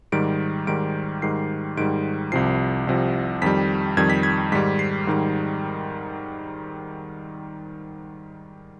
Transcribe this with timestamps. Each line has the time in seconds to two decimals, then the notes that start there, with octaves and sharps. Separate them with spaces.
0.12 G#2 D#3 G3 D7
0.67 G#2 D#3 G3 D7
1.22 G#2 D#3 G3 C7
1.77 G#2 D#3 G3 D7
2.32 C2 C3 F3 C7
2.87 C2 C3 F3
3.42 F2 D#3 G3 B6
3.97 F2 D#3 G3 G#6
4.10 B6
4.23 G#6
4.52 G#2 D#3 G3 B6
4.79 C7
5.07 G#2 D#3 G3